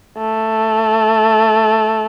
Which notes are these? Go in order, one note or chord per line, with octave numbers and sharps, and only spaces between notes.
A3